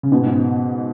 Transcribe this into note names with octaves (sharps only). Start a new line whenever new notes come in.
C#3
G#2 B2
G#2